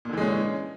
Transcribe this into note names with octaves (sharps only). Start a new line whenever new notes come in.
A#2 D3 E3 G#3 C#4